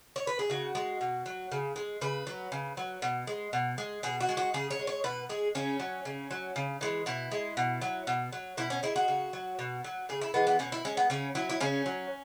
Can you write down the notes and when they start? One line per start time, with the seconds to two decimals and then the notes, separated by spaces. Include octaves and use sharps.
0.16 C#5
0.27 B4
0.39 G#4
0.50 C#3 F#4
0.75 G#3
1.01 B2
1.26 F#3
1.52 C#3
1.76 G#3
2.01 C#3 B4
2.27 F#3
2.52 C#3
2.77 F#3
3.02 B2
3.27 G#3
3.53 B2
3.78 G#3
4.03 B2 G#4
4.20 F#4
4.29 G#3
4.37 F#4
4.54 C#3 G#4
4.71 C#5
4.79 G#3
4.87 C#5
5.04 B2 B4
5.29 G#3 G#4
5.55 C#3 C#4
5.80 F#3
6.05 C#3
6.31 F#3
6.56 C#3
6.81 E3 G#3
7.06 B2 E4
7.31 G#3
7.57 B2
7.82 F#3
8.07 B2
8.33 F#3
8.57 B2 E4
8.70 C#4
8.83 G#3 E4
8.96 F#4
9.08 C#3
9.33 F#3
9.59 B2
9.84 F#3
10.09 C#3 G#4
10.22 E4
10.34 E3 G#3 B3
10.47 B3
10.59 B2 C#4
10.72 E4
10.85 G#3 C#4
10.97 B3
11.10 C#3 C#4
11.35 F#3 E4
11.50 E4
11.60 C#3 C#4
11.86 F#3